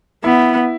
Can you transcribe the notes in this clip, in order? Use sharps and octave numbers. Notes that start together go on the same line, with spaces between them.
B3 E4